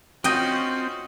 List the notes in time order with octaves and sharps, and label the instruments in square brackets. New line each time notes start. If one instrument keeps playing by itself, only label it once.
[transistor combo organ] C4 [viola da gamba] C#4 F4 F#4 [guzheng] D#5 G5 [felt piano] D#6 G6